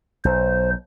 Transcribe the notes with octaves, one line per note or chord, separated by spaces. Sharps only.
B1 C5